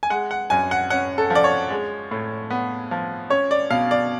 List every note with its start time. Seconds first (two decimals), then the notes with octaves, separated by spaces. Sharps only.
0.03 G#5
0.10 G#3 F#5
0.31 F#5
0.50 F#2 G#5
0.71 F#5
0.90 C#4 F#5
1.18 A4
1.30 F3
1.35 D5
1.44 C#5
1.70 G#3
2.11 A2
2.50 B3
2.91 F3
3.30 C#4 C#5
3.51 D5
3.70 B2 F5
3.91 D5